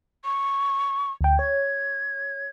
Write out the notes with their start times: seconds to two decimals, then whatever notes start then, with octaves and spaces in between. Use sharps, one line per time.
0.25 C#6
1.21 D2 G5
1.39 C#5 G#6